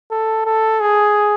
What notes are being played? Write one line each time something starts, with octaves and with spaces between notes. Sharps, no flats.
A4
A4
G#4